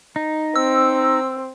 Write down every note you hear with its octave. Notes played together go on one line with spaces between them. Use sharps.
D#4
C4 E6